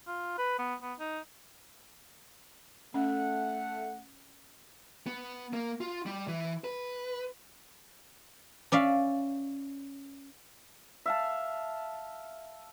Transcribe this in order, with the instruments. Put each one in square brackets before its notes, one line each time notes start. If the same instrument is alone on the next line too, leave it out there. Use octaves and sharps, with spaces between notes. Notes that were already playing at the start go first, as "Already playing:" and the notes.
[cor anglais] F4
B4
B3
B3
D#4
[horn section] A3 F#5 [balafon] C#4
[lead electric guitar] B3
A#3
F4
G3
E3
B4
[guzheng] C#4 D5 E5 F5
[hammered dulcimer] E5 F5 A5